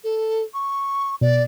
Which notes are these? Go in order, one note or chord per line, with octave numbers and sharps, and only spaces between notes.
A4
C#6
B2 D5